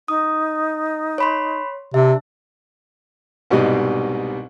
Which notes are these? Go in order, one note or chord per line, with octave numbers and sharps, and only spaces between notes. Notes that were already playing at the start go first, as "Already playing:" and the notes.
D#4 D#6
C#5 B5 C6
C3 D4 E5
C2 G#2 B2 G3 G4 D#5